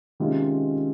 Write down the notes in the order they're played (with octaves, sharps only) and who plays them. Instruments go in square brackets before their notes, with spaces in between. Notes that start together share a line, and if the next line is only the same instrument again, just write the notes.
[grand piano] C3 D#3 G#3 C#4 F4